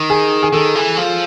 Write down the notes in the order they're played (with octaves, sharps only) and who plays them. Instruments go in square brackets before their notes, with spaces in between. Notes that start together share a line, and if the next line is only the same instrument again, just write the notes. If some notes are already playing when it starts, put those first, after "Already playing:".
Already playing: [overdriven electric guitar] D#3
[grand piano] G#4
G#4
[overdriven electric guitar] D#3 [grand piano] A4
[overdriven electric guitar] E3
F3